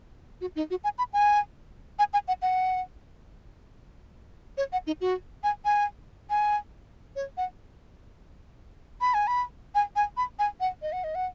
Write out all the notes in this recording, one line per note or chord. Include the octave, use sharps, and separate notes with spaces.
F#4
D#4
F#4
G#5
B5
G#5
G#5
G#5
F#5
F#5
C#5
F#5
D#4
F#4
G#5
G#5
G#5
C#5
F#5
B5
G#5
B5
G#5
G#5
B5
G#5
F#5
D#5
F#5
D#5
F#5